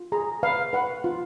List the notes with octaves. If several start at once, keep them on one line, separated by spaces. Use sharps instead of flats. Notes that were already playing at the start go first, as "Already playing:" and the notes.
Already playing: F4
G#4 A#5
B4 F5
B4 F#5
F4